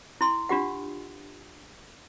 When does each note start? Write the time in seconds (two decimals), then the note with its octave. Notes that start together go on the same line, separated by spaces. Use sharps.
0.21 E4 C6
0.49 D4 F4 G4 F#5